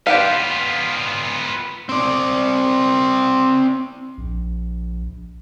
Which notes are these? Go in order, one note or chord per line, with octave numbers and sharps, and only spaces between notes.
B3 F4 G4 B4 F5
C4 D5
A#1